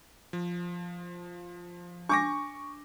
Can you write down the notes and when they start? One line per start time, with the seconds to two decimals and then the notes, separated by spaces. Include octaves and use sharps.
0.33 F3
2.09 D4 C#6 D6 A#6